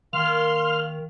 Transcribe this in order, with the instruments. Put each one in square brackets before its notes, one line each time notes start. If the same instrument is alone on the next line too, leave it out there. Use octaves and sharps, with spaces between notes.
[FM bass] D#3 [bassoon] A#3 [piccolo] C6 [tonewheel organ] F6